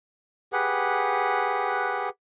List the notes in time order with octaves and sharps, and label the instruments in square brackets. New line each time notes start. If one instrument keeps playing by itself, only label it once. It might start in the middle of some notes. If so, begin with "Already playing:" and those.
[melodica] G4 G#4 B4 F#5